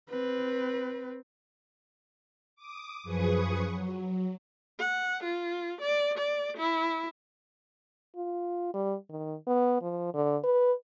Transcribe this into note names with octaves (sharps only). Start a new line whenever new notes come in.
C4 B4
D6 D#6
F#2 F3 G#4 B4 C#6 D#6
F#3
F#5
F4
D5
D5
E4
F4
G3
D#3
B3
F3
D3
B4